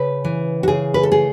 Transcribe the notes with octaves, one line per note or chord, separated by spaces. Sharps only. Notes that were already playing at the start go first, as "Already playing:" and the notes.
Already playing: C#3 B4
E3
F#4
C#3 G#4
B4
A4
A3 G#4